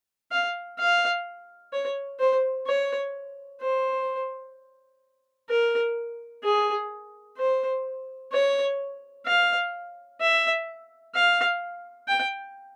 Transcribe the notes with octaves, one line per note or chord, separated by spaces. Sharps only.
F5
F5
C#5
C5
C#5
C5
A#4
G#4
C5
C#5
F5
E5
F5
G5